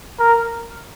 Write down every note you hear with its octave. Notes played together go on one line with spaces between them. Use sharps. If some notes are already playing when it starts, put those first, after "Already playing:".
A#4